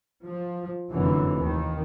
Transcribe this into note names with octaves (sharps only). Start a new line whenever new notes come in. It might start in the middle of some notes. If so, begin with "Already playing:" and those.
F3
F1 F#2 D3 E3
D#2 D#3